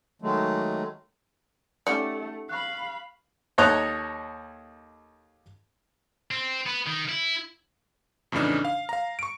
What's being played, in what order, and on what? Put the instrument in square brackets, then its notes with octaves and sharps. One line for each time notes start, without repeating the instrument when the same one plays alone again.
[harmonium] D#3 F#3 G#3 A3
[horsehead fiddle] A3 [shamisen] C#4 G4 D5 [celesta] D#4 F#5 C#7
[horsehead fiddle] F5 B5 [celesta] C#6 F#6
[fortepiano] D#2 A4 C#5 D#5 A#5 F#6
[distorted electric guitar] C4
B3
D#3
E4
[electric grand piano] F2 A2 C#3 E3 D4 D#4
F5
F5 A#5
C#6 D7